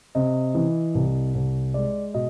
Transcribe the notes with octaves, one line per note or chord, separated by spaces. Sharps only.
C3 D#5
E3
C2
C2
G#3 D5
B2 D#5